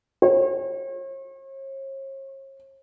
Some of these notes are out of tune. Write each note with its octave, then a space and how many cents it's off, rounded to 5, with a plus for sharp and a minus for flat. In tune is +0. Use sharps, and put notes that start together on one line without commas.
C#5 -45